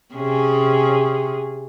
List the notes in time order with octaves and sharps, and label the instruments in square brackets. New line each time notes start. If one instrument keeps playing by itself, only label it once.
[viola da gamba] C3 C#4 G#4